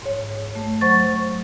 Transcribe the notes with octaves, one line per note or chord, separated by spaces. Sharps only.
G#2 C#5
A3
F#3 C5 C#6 A6